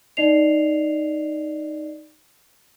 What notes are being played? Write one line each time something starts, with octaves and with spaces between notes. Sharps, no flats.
D#4 D5 D#5 C7 F7